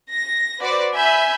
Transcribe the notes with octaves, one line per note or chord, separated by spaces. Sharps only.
A#6
F#4 B4 C5 D5
E5 G#5 B5 G6